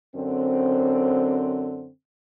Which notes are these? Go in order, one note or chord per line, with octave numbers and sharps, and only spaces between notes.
F#2 D3 C4